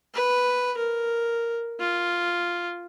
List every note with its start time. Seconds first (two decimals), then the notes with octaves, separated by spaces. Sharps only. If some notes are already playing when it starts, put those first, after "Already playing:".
0.15 B4
0.77 A#4
1.80 F4